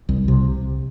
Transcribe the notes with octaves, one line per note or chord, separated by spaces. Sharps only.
C2
C3